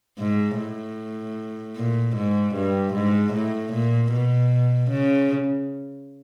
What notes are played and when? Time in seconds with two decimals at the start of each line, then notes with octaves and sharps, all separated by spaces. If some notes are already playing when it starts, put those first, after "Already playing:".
0.19 G#2
0.58 A2
1.76 A#2
2.16 G#2
2.55 G2
2.94 G#2
3.33 A2
3.73 A#2
4.12 B2
4.90 C#3